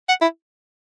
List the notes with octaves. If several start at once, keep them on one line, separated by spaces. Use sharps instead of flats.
F#5
E4